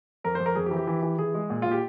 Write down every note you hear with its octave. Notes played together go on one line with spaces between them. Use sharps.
F2 A#4
C5
F2
A#4
F2 G#4
G4
E3
G4
E3
E3
E3 G#4
G#3
A#2
A#2 F4
G4